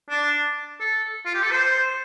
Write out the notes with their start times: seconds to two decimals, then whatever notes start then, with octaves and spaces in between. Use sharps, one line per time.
0.09 D4
0.80 A4
1.26 F4
1.34 G4
1.43 A4
1.51 C5